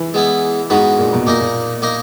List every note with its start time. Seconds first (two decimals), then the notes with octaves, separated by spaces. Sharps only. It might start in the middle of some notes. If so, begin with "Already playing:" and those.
Already playing: E3
0.14 G#3 B3 E4
0.70 G#2 G#3 B3 F#4 B4
0.99 A#2
1.13 B2
1.26 A#2 A#3 D#4 A#4
1.40 A#2
1.82 A#3 D#4 A#4